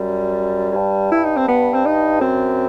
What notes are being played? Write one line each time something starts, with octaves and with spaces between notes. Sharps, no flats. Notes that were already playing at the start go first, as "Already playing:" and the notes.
Already playing: F#2 G3
F#2
G2
E4
D#4
C4
B3
C4
D#4
F#2 C4